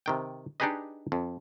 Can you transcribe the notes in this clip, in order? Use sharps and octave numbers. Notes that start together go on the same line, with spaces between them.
C3 D#3 G5
D4 D#4 G4 G#4 B4 D#5
F2